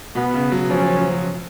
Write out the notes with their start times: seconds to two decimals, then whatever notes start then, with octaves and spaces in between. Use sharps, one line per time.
0.15 B2 B3
0.34 C#3
0.52 F#3
0.70 F3 C#4
0.83 F3
0.97 F3
1.10 F#3